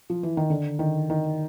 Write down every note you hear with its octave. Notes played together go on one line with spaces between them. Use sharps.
F3
E3
D#3
D3
D#3
D#3